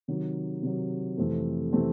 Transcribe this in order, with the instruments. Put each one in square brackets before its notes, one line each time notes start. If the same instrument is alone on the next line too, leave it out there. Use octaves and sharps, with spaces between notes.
[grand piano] C3 D#3 F#3
C3 D#3 F#3
F2 C3 E3 A3 C4
C3 E3 A3 C4